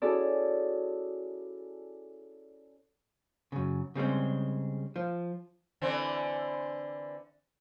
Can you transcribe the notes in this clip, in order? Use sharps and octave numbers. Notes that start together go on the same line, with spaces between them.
C#4 E4 F#4 G#4 A4 D5
F#2 C#3
C#3 G3 G#3 C4
F3
D3 E3 C4